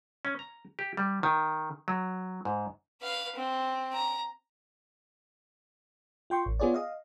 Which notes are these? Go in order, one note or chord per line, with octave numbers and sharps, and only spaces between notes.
C#4
A#5
G4
G3
D#3
F#3
G#2
B4 F5
C4
A#5
F4 G5 C6 C#6
A1
B3 F4 G#4 C#5 D5
D#5 F5